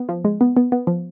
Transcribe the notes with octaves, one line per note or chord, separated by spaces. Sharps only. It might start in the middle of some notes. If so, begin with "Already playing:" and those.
Already playing: B3
F3
G#3
B3
B3
B3
F3